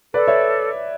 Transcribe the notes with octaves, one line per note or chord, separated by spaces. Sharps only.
A4 B4 D5
C#5 E5